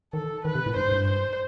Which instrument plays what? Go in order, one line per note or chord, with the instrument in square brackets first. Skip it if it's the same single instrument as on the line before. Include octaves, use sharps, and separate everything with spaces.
[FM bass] D#3 [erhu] A4
[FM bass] D#3 [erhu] B4
[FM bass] C3
A2
[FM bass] G2 [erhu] C5
[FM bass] G2
[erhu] C5